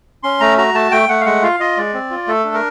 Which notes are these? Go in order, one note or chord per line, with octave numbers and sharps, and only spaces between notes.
C#4 C6
A3 A#5
F#4 A#5
A3 A5
A3 G5
A3 F#5
F5
G#3 F#5
F4 F5
F4 D#5
G#3 D5
C4
F4
A3 A4
D4
A#4